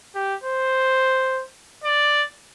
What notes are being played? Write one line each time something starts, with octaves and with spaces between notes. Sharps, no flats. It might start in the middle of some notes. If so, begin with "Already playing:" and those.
G4
C5
D5